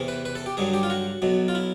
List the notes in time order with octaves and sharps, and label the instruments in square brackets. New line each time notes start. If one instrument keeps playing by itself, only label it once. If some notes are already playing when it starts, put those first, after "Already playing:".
Already playing: [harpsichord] E2 C3 E3
B4
B4
A4
G4
G2 D3 F#3 G#4
G4
F4
F#4
B1 B2 F#3
F4
E4